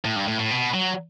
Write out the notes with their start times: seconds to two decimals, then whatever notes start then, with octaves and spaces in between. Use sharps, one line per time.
0.05 A2
0.16 G2
0.28 A2
0.39 A2
0.51 B2
0.74 F#3